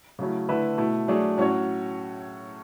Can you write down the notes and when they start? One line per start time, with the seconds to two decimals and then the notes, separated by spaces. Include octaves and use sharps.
0.19 C#3 F#3 A3 C#4 E4
0.49 D3 A3 E4 B4 E5
0.78 B2 A3 E4
1.08 F#3 A3 D4 G#4 C#5
1.38 A2 F#3 C#4 F#4 C#5